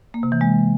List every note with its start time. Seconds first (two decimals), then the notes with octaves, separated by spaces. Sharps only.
0.14 A#3
0.23 C3
0.32 E3
0.41 G#3